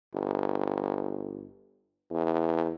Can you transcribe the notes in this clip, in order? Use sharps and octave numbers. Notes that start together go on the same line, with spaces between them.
G1
E2